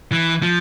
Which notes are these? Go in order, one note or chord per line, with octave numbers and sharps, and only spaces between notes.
E3
F3